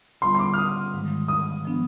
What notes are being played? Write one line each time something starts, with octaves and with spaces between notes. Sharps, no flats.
D3 G3 B3 F4 C6
C6
D6
F6
D#6
G#2 D#3 G#3
D#6
F3 B3 D4